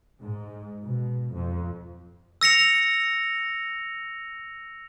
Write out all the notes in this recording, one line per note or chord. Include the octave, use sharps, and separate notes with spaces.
G#2
B2
F2
E6 A#6 C#7 F7